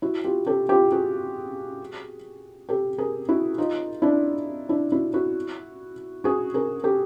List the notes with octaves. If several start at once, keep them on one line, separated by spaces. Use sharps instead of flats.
E4 F#4
F4 G4
G4 A4
F4 G4
F#4 G#4
G4 A4
G#4 A#4
E4 F#4
D#4 F4
D4 E4
D4 E4
E4 F#4
E4 F#4
F#4 G#4
G#4 A#4
G4 A4